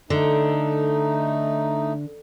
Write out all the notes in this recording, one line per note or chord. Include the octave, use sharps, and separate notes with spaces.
D3 A3 D#4